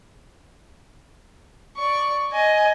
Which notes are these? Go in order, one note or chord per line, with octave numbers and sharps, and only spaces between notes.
D5 C#6
D#5 G#5